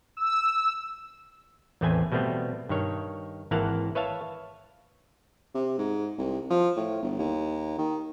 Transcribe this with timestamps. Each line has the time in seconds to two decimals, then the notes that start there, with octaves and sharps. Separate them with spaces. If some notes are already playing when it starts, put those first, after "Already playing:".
0.17 E6
1.81 A1 E2 A3 C4 B4 G#5
2.12 B2 G3 A3 B3 C4
2.69 G2 D#3 C#5
3.51 G#1 E3 A#3 F5 F#5 A5
3.95 B4 C#5 E5 F5 A5
5.54 C3
5.78 G#2
6.18 C2
6.50 F3
6.76 A2
7.02 G1
7.19 D#2
7.78 D#3